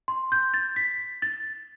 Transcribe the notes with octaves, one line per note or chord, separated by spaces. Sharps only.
C6
G6
A6
B6
A6